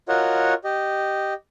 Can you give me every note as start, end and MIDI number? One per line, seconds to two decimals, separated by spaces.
0.09 0.54 65
0.09 0.54 66
0.09 0.54 70
0.09 0.54 73
0.09 0.54 75
0.09 0.54 78
0.64 1.34 67
0.64 1.34 75